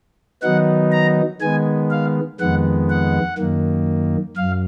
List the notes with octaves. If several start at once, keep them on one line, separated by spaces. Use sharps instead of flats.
D#3 F#3 B3 D#4 F#5
A#5
D#3 G#3 B3 G#5
F5
F2 D#3 G#3 B3 F#5
F#5
F#2 D#3 A#3
F#2 F5